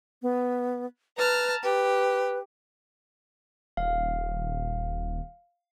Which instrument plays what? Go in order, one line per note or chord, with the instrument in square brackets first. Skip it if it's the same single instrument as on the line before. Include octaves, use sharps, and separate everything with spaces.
[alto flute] B3
[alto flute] B4 [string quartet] A5 A#5 F6
[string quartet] G4 [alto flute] B4
[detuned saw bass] D#1 [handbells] F5